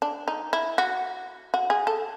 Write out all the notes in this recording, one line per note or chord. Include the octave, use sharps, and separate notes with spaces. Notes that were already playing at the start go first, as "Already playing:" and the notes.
D4
D#4
E4
F#4
F#4
G#4
A4